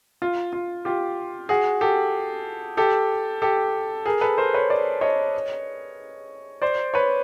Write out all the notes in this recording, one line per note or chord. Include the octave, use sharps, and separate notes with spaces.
F4
F4
F4 G4
F#4 G#4
G4 A4
G4 A4
G4 A4
G#4 A#4
A4 B4
A#4 C5
B4 C#5
C5 D5
C#5 D#5
C5 D5
B4 C#5